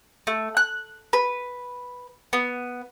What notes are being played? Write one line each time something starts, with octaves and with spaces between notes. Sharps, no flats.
A3
F#6
B4
B3